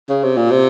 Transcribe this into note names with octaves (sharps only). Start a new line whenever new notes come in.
C#3
C3
A#2
C3